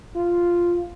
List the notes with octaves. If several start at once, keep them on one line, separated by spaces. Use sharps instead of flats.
F4